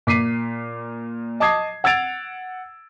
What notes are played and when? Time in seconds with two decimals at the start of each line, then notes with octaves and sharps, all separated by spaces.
0.07 A#2 D6 B6 C7 D#7
1.40 D#5 A5 D6 D#6 G#6 C7
1.84 F#5 E6 G#6 A6 D7 F7